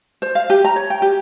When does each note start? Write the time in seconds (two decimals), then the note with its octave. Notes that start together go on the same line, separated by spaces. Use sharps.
0.22 C5
0.35 F5
0.50 G4
0.65 A#5
0.76 C#5
0.90 G5
1.02 G4